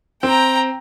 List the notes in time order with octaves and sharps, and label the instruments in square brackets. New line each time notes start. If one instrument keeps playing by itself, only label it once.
[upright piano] C4 [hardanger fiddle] G5 A#5